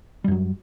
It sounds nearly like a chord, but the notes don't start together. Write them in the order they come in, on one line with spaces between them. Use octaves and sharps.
G3 F#2 F#3